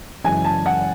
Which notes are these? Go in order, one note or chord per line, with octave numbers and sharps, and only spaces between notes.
F#2 C#3 E3 G#3 G#5
A5
F#5